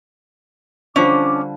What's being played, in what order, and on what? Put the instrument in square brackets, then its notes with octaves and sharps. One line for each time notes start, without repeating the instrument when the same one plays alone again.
[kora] D3 F3 G3 [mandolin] C#4 [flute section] D4 D6